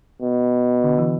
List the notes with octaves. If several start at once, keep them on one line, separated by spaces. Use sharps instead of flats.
B2
D3
E3